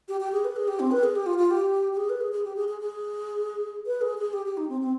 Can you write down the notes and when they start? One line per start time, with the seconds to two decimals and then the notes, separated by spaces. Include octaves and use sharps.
0.09 G4
0.20 G4
0.32 G#4
0.45 B4
0.56 G#4
0.68 G4
0.80 C4
0.91 B4
1.03 G#4
1.16 G4
1.26 F4
1.38 F4
1.51 G4
1.93 G4
1.97 G#4
2.09 B4
2.21 G#4
2.32 G#4
2.45 G4
2.56 G#4
2.68 G#4
2.80 G#4
3.86 B4
4.01 G#4
4.18 G#4
4.33 G4
4.46 G4
4.57 D#4
4.69 C4
4.81 C4